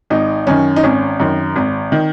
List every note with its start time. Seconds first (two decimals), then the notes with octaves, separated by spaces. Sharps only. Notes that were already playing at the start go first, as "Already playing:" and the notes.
0.10 G#1 D#4
0.47 F#2 D#3 C#4
0.76 D#4
0.83 G#1 C#4
1.20 F#2 D#3
1.56 G#1
1.92 D#3